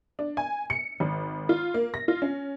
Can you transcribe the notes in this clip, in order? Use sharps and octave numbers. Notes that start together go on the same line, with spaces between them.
D4
G#5
C#7
G#1
F4
A#3
A#6
F4
C#4